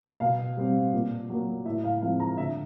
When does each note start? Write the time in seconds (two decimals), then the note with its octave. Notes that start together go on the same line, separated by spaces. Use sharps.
0.20 B2 F5
0.57 G3 C4
0.93 A#2
1.30 F#3 A#3
1.65 A2 E5
1.84 F5
2.02 F3 G#3 C4 F5
2.20 A#5
2.38 D3 E5